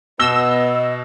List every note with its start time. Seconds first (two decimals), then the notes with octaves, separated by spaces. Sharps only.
0.19 B2 B3 D#5 E6 A#6 G7